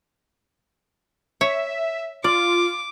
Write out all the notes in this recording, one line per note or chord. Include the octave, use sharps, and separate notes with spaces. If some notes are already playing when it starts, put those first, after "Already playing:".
C#5 E5
F4 D5 D6